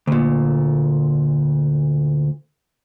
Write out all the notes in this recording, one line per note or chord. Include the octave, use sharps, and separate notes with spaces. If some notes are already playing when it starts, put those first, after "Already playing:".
D2 A#2